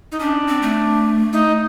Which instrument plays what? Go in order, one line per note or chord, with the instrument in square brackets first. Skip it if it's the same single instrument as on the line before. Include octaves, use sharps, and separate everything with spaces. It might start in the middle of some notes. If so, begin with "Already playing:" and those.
[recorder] D#4
[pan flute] C#4 [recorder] D4
[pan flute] C4
A3
[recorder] D#4